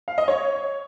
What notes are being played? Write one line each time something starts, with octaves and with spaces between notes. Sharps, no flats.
F5
D#5
C#5